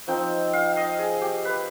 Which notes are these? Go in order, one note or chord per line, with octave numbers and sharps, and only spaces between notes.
F3 C4 D#4 G5
F5
D#5
G#4
G4
B4